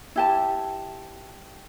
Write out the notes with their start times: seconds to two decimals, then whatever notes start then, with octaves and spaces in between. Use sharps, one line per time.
0.16 E4 G4 A5